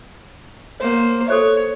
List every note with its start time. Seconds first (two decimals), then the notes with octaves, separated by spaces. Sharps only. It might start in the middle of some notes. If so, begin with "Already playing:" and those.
0.80 A#3 C5 C#5 F#5
1.28 A4 C5 C#5 E5